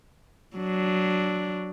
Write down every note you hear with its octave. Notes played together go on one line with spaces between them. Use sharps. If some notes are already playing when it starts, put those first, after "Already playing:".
F#3 D4